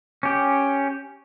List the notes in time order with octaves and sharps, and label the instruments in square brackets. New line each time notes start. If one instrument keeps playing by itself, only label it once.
[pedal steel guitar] C#4 G4